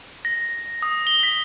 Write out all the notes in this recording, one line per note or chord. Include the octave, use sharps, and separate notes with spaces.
A#6
D#6
G7
B6